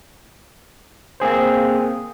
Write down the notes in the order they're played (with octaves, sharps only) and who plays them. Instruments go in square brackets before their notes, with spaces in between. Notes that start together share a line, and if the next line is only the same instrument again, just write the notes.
[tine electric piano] A#3 C4 G#4 C5